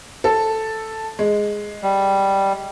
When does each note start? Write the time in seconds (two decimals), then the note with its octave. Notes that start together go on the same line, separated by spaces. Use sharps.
0.24 A4
1.19 G#3
1.83 G3